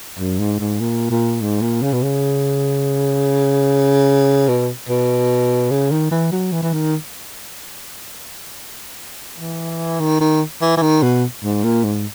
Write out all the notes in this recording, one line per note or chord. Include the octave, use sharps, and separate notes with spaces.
F#2
G#2
G#2
A#2
A#2
G#2
A#2
C#3
B2
C#3
B2
B2
C#3
D#3
E3
F#3
E3
E3
D#3
E3
D#3
D#3
E3
E3
D#3
B2
G#2
A#2
G#2